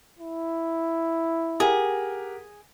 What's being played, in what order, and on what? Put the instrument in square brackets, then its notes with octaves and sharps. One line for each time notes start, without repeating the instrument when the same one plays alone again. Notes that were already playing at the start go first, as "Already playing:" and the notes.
[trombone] E4
[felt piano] G4 A#4 F#5 [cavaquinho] G#4